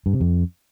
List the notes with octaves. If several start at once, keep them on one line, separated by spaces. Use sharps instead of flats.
G2
C3
F2